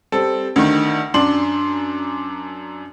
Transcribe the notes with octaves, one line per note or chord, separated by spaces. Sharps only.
G3 C4 A4
D2 D#3
F#2 D4 C6 F#7